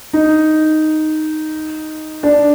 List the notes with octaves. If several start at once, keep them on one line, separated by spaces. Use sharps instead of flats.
D#4
D4